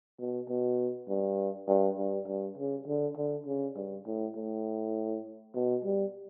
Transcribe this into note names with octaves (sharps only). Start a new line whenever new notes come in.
B2
B2
G2
G2
G2
G2
C#3
D3
D3
C#3
G2
A2
A2
B2
G3